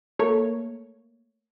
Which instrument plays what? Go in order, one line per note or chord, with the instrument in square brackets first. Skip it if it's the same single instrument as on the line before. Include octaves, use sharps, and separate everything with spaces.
[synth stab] A3 A#3 C#5